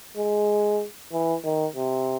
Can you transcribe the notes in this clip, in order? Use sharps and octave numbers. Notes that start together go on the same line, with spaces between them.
G#3
E3
D#3
C3